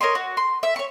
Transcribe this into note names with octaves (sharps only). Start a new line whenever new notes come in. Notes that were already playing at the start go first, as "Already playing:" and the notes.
A#4 C#5 D#5 C6
F#4
C6
E5
C#5 C#6